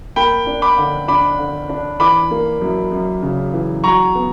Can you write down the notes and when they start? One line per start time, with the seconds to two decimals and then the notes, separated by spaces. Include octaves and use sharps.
0.16 A#3 G5 B5
0.47 D4
0.62 B5 D6
0.78 D3
1.08 D4 B5 D6
1.39 D3
1.69 D4
2.00 E3 B5 D6
2.31 A#3
2.62 F#2
2.92 F#2
3.22 C#3
3.53 E3
3.84 F#3 A#5 C#6
4.15 B3